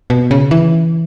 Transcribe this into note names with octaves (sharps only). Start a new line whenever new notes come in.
B2
C#3
E3